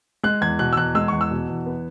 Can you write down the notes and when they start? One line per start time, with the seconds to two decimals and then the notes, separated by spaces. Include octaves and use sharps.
0.23 G#3 F#6
0.41 E2 G#6
0.59 B2 F#6
0.73 E6
0.77 E2 F#6
0.95 G#3 E6
1.08 E2 C#6
1.21 E6
1.31 B2
1.48 E2
1.66 B3